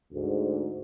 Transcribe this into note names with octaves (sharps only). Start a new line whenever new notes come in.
D2 G#2